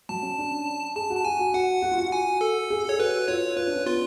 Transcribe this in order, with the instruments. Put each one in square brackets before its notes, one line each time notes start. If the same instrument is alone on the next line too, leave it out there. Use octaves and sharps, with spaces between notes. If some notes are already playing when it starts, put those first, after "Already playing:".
[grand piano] F#3 [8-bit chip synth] A5
[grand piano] C#4
D4
[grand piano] G#4 [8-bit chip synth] A5
[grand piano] F#4
[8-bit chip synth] A5
[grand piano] F#4 [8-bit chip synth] G#5
[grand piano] F#4
[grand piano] F#4 [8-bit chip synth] F#5
[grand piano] F#4
F4
F#4
[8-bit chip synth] G#5
A4
[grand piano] G#4
[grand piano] G#4 [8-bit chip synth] C#5
[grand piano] F#4 [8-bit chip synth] B4
[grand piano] F4 [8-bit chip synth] C#5
[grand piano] F4 [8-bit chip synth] B4
[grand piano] D4
C#4
[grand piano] B3 [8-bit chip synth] F4